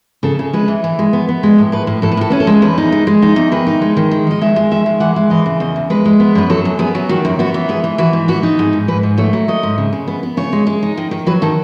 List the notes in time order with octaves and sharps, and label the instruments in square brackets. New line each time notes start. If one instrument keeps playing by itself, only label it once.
[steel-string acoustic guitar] C#3 A4
C#3
G#3 B4
E3
E3
G#3
B3
B3
G#3
A2
A2 B4
A2
A2 A4
B4
A2 A4
C#4 B4
A4
G#3
E2 B4
D#4
G#3
G#3
D#4
E2
D#3 B4
D#4
G#3
D#3
G#3
D#4 D#5
G#3 E5
G#3
D#3 E5
G#3
E3 F#5
G#3
E3 D#5
C#3
E2 D#5
E2
G#3 B4
G#3
B3
F#2 B4
F#3 A4
F#2
B3 G#4
F#3
D#3 F#4
F#2
B3 F#4
E3
G#2 G#4
E3
E3 F#4
G#2
B3 F#4
D#4
G#2 G#4
G#2
G#2 B4
G#2
A3 C#5
F#3
A3 D#5
G#2
C#3
C#3
B3
B3
C#3 C#5
G#3
G#3
D#4
D#3
D#3
F#3 B4
D#3 A4